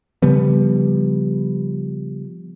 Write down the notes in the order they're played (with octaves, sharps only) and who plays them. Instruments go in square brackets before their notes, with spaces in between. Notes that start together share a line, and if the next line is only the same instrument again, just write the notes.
[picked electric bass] C#3 F3 G3 B3